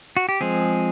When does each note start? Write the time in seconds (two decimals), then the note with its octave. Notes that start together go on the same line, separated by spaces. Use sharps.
0.17 F#4
0.29 G4
0.41 F3 G#3 C4 G#4